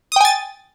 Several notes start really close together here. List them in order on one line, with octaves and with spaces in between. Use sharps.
D#6 G5 G#5 A6